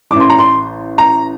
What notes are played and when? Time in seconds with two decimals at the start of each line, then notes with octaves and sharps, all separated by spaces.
0.11 A1 A2 E3 D6
0.20 C6
0.30 A#5
0.39 C6
0.98 A#5